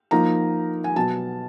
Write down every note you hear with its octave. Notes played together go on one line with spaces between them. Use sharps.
F3 A#3 D#4 A#5
G#5
B2 F#3 B3 A5